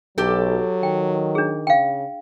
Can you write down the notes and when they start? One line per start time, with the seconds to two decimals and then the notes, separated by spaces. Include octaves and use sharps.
0.18 B1 F#3 G4 A4
0.83 D#3 G5
1.35 D4 G#4
1.67 C#3 F5 G5